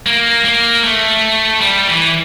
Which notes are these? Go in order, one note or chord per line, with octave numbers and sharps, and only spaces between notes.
A#3
A#3
A3
G3
E3